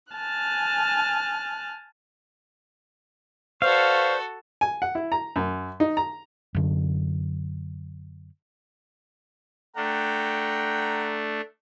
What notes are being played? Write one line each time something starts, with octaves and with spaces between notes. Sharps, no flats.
G#5 A5 F6 F#6
F#4 A4 B4 C5 D5 F5 C#6
G#5
F#5
E4
A#5
F#2
D#4
A#5
F#2 D3
A3 D4 F#5 G5 A#5